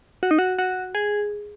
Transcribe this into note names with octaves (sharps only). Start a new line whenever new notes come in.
F#4
D#4
F#4
F#4
G#4